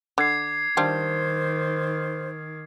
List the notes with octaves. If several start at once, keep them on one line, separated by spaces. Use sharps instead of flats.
D3 D6 G#6 C7
D#3 G3 D4 F4 C5